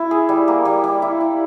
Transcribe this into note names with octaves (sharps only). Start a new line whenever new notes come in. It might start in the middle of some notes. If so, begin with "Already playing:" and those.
Already playing: E4
G#4
G3
A#3
G3
G3
E4
E4